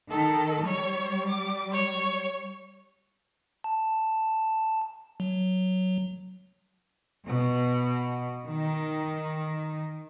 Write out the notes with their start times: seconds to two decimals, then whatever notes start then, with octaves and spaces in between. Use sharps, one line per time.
0.11 D#3 A4
0.65 G3 C#5
1.28 D6
1.72 C#5
3.64 A5
5.20 F#3
7.27 B2
8.49 D#3